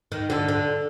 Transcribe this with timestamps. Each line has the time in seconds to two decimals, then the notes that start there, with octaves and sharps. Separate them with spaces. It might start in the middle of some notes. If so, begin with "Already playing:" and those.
0.12 D#3
0.30 D3
0.49 D3